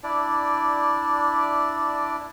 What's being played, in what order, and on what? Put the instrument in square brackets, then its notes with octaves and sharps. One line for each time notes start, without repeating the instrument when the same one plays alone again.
[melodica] D4 E4 D5